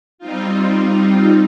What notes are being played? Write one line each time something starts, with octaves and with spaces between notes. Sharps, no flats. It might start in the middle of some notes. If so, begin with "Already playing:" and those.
G3 C4 D#4 F4